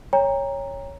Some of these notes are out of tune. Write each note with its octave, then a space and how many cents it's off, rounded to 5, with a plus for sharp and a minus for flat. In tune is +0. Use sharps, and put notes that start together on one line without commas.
C#5 +0 G5 +35 A#5 +0